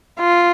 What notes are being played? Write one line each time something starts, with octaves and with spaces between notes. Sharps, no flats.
F4